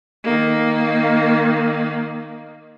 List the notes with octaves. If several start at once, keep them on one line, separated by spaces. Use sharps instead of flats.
D#3 A#3